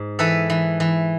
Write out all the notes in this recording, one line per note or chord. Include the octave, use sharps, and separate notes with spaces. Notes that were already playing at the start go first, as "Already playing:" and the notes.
Already playing: G#2
E3 A4 B4
E3
E3